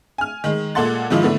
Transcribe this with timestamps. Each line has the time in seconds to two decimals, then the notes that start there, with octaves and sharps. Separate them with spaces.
0.18 G#5 F6
0.44 D#3 G#3
0.75 A#2 G#3 A4 F#5 C6 A6
1.10 G#2 D#3 F3 E4
1.22 D3 A3 B3 E4